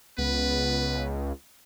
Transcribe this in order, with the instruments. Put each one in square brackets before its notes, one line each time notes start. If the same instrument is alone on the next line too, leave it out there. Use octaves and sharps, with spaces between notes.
[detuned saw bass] C#2 [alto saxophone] B3 [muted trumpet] B4